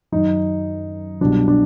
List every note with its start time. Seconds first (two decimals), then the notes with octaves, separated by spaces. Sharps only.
0.12 F#2 D#3 F#3 D#4
1.21 C2 B2 F#3 D4
1.48 D4